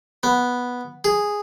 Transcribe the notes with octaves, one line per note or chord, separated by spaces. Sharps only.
B3
G#4